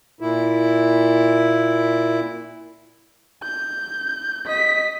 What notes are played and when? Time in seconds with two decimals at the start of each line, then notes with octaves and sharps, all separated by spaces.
0.21 A#2 E4
3.43 G6
4.46 D#5 B6